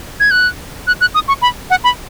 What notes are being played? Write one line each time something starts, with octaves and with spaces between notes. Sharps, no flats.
G#6
F#6
F#6
F#6
D#6
C#6
B5
F#5
B5